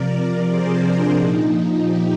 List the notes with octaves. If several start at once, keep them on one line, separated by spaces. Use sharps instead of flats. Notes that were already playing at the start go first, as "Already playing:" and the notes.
Already playing: C3 F3 A#4 D5
A#4 D5
G#4 C5
D4
A#2 F3 D#4
D#4
D#4 G4